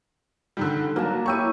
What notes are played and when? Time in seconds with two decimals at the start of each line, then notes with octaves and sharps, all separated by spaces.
0.57 D3 D#3 G3
0.96 F#3 A#3 A5
1.26 E4 G4 C#5 C#6 E6 D#7